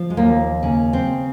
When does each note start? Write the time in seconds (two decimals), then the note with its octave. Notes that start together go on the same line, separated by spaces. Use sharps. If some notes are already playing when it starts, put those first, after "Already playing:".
Already playing: F3
0.10 G#3
0.17 D#2 A#3
0.63 C#3
0.93 C4